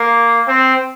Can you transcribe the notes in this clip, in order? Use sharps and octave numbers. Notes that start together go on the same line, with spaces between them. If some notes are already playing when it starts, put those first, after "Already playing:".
Already playing: A#3
C4